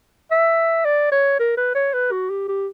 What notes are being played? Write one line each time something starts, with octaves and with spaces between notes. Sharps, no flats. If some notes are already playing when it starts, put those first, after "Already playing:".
E5
D5
C#5
A#4
B4
C#5
B4
F#4
G4
G4